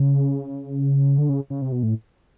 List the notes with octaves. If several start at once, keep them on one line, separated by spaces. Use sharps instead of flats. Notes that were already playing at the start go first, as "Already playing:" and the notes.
Already playing: C#3
D3
C#3
C#3
C3
B2
A2